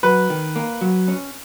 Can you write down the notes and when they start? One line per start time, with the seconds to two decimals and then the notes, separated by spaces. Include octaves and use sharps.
0.03 F#3 B4
0.30 D#3
0.56 A#3
0.81 F#3
1.08 C#4